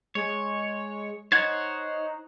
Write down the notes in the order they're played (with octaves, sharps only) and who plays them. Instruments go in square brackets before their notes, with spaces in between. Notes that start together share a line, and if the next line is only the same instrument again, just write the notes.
[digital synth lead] G#3 [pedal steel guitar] C#5
[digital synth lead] D#4 [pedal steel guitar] C5 C#5 F#5 [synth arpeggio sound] G#6